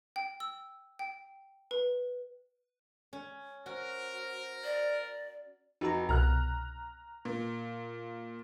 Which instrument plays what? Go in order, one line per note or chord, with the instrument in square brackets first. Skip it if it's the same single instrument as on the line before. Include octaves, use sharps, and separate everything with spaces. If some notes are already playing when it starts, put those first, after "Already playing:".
[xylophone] G5
E6
G5
B4
[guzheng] C#4
[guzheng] F#4 [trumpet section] A#4 [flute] C5
[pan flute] D5
[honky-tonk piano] F1 [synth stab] D#4 F#4 A#5
[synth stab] C2 B2 [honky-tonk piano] A#5 F6 F#6
[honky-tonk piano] A#2